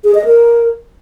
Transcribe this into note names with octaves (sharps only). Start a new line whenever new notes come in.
G#4
D#5
A#4